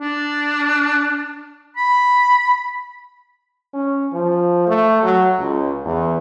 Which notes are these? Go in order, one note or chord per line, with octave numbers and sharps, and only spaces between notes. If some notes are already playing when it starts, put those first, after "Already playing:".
D4
B5
C#4
F3
A3
F#3
C#2
E2